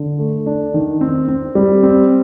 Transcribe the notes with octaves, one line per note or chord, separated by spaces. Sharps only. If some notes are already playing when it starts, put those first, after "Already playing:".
Already playing: D3
A3
D4
D#3
C4
C4
G3
C4